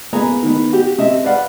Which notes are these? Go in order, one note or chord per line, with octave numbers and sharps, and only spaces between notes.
A#3 B3 G#4 G#5 A#5
D#3 B3
F#4 G4
C3 D#5 E5
B4 D5 F5 F#5